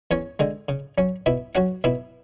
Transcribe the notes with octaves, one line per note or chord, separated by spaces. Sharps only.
E2 C#4 C#5
D3 G#3
C#3
F#3 C#4
B2 E4 E5
F#3 C#4 F#4 F#5
B2 E4 E5